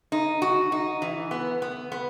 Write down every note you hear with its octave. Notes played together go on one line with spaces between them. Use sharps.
D#4
F#4
D#4
E3
B3
B3
B3